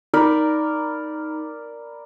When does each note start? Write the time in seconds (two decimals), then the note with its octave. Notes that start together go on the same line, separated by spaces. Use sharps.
0.14 D#4 A#4 D5 B5